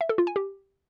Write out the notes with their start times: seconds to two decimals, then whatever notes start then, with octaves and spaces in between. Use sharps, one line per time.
0.01 E5
0.09 A4
0.18 F4
0.27 G#5
0.36 G4